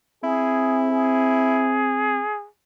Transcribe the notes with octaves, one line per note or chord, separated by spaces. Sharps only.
C4 E4 G#4
G#4